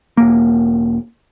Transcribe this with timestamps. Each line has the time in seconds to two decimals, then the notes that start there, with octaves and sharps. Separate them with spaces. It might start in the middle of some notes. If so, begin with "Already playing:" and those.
0.17 E1 A#3